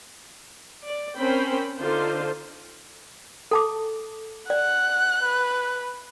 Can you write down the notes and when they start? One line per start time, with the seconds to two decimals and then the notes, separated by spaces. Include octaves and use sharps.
0.87 D5
1.17 C4 C#4 A#4 C5 G5 B5
1.78 D3 D4 D#4 F4 C5
3.51 A4 A5 D6
4.50 D5 F#5 F#6
5.23 B4